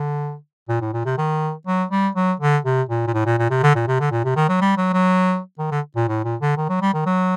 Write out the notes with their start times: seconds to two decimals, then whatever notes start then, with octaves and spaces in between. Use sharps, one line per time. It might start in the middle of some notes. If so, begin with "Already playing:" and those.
Already playing: D3
0.69 A#2
0.81 A2
0.93 A#2
1.05 C3
1.18 D#3
1.67 F#3
1.91 G3
2.15 F#3
2.40 D3
2.65 C3
2.89 A#2
3.07 A#2
3.14 A2
3.26 A#2
3.39 A#2
3.50 C3
3.63 D3
3.75 A#2
3.88 C3
4.00 D3
4.11 A#2
4.25 C3
4.36 D#3
4.49 F#3
4.61 G3
4.77 F#3
4.93 F#3
5.59 D#3
5.72 D3
5.96 A#2
6.08 A2
6.24 A#2
6.41 D3
6.57 D#3
6.69 F#3
6.82 G3
6.94 D#3
7.06 F#3